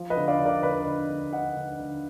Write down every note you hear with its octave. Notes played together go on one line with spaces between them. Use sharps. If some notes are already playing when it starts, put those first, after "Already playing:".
Already playing: F3
B4 D#5
D3
D5 F5
D3
A#4 D5
D3 B4 D#5
D3
D3
D3 D#5 F#5
D3
D3